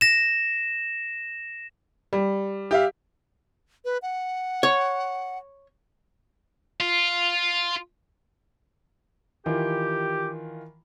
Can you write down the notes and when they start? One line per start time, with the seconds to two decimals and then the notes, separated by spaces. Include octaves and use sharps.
0.01 A#6 E7
2.13 G3
2.71 G4 E5 F5
3.85 B4
4.02 F#5
4.63 C#5
6.80 F4
9.46 D#3 E3 F4 G4